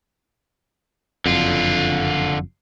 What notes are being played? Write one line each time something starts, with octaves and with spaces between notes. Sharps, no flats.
F#1 F2 D3 F4